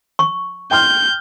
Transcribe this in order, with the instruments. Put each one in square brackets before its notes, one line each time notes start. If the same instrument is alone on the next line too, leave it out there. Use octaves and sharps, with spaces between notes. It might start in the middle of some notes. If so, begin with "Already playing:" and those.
[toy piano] C#6
[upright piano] G5 C6 F6 [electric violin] G6